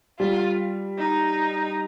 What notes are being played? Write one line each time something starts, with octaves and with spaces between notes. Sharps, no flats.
G3 F4
D#4